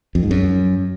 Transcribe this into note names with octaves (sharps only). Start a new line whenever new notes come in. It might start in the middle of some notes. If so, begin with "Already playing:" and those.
F2
G#2
F#2